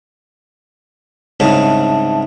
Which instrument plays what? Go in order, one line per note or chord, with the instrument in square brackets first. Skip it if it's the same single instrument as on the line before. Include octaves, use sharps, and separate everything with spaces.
[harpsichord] C2 G#2 C#3 [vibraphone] E5 A5